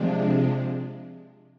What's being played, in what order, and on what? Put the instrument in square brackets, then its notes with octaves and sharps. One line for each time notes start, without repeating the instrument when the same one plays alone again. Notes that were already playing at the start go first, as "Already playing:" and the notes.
Already playing: [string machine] C3 F3 G#3 D4